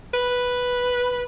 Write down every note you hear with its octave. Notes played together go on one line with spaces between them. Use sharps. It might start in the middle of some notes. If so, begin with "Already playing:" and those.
B4